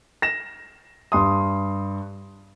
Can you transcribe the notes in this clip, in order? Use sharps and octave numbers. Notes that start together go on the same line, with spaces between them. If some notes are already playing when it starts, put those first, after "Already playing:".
A#6 E7
G2 C6 D#6